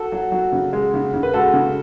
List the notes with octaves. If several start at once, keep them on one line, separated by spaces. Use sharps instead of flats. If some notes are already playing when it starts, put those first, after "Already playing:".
Already playing: F#4 A4
F#3
F#3
C#3
G#3
C#3
C#3
B4
G#3 F#4 A4
C#3